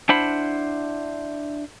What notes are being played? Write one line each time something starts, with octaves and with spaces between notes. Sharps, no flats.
D4 E4 C5 F#5 B5